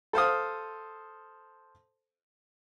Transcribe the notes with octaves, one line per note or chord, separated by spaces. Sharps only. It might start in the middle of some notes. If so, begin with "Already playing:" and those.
A4 C5 F5 D#6